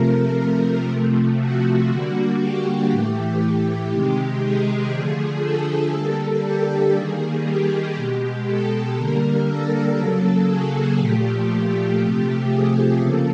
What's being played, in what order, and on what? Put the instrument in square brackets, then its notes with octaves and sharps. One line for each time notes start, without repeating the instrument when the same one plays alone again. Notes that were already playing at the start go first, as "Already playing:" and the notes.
Already playing: [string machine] C3 F3 A3 A#4
C3 F3 A3
F#4
D3 G3 A#3 F#4
G4
A2 E3 A3
C3 D#3 G#3
G#4
D3 F3 A3
A4
D3 G3 A#3
G4
D#3 G3 A#3 G#4
G4
B2 G#3
A4
D3 G3 A#3 A#4
A4
C#3 F#3 A#3
G#4
A#2 F3 A3 G4
G4
C3 F3 A3
G#4
C#3 F3 A#3 A4